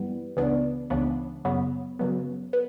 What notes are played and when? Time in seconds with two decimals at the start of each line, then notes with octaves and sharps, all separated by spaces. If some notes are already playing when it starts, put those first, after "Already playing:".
Already playing: G2 E3 G3 B3
0.37 C#2 C#3 E3 B3 D4
0.90 C#2 C#3 E3 B3 D4
1.45 F#2 C#3 F#3 B3
1.99 F#2 C#3 F#3 B3
2.53 B3